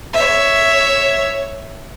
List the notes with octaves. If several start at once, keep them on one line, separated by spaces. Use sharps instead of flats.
C#5 E5